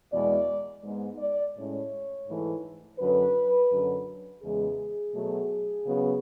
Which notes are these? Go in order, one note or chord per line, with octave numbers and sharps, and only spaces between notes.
E2 B2 G#3 B3 D5
G#2 G#3 B3
D5
A2 G#3 C#4 C#5
G#2 E3 A3
F#2 D3 F#3 B4
F#2 D3 F#3
E2 C#3 E3 G#3 G#4
B2 F#3 A3
C#3 F#3 B3